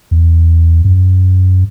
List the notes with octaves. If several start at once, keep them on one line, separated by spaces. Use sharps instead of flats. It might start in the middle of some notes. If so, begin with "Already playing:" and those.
E2
F#2